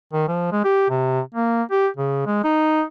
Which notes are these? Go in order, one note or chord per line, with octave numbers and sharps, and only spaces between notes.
D#3
F3
G#3
G4
C3
A#3
G4
C#3
G#3
D#4